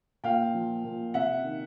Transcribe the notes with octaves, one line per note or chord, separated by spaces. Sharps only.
A#2 F5 G5
F3
A#2
C3 E5 F#5
D#3